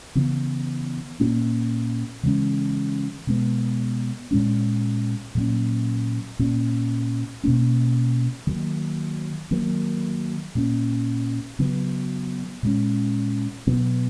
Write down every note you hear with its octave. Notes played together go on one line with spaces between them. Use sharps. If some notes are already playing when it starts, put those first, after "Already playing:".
C#3 E3 B3
A#2 A#3 C#4
C#3 E3 G#3 C#4
B2 G#3 B3
A#2 G#3 C#4
A#2 F#3 A#3 C#4
A#2 A#3 C#4
B2 A#3 C#4
D#3 F#3 A#3
D#3 F#3 A#3
A#2 A#3 C#4
C#3 F#3 B3
A#2 G#3 C#4
B2 F#3 B3